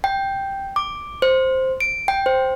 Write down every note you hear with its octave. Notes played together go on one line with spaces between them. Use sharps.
G5
D6
C5
D7
G5
C5